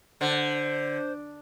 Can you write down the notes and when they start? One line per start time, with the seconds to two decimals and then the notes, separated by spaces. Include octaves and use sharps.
0.21 D3 C5